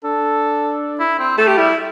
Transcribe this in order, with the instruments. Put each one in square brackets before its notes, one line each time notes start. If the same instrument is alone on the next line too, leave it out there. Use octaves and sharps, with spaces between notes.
[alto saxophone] D4 [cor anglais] A4
[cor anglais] E4
C4
[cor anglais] A3 [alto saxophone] A4
[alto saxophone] G4
[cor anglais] G3 [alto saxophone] E4